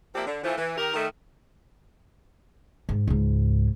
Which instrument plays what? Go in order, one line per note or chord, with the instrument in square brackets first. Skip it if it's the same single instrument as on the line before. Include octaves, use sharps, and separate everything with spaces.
[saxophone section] F3 A#3 C4 G4 D5 E5
D3
E3 F3 A3
E3
D#3 G4 A#4
D#3 A3
[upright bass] G#2
C#2 G#2